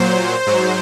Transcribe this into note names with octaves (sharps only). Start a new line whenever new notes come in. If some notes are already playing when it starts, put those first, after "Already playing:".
Already playing: A#2 F#3 C5
G#2 F#3